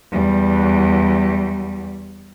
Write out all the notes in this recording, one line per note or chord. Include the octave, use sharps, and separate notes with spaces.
E2 G3